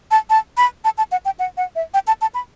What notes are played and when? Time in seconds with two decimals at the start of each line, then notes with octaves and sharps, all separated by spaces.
0.11 A5
0.30 A5
0.57 B5
0.84 A5
0.98 A5
1.12 F#5
1.25 G5
1.39 F#5
1.57 F#5
1.76 E5
1.94 G5
2.07 A5
2.21 A5
2.34 B5